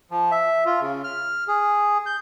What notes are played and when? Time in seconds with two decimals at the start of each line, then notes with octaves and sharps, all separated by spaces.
0.11 F3
0.32 E5
0.66 F4
0.81 C#3
1.04 F6
1.48 G#4
2.06 G6